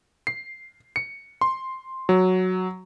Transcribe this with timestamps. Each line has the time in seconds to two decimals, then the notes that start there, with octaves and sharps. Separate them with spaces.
0.27 C7
0.96 C#7
1.41 C6
2.09 F#3